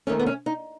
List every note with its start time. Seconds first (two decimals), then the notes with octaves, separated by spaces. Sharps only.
0.07 D#2 D#3 A3 C#4
0.19 B3
0.26 C#4
0.46 D#4